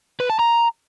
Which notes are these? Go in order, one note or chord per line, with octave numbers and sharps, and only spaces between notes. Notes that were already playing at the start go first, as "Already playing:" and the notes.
B4
A5
A#5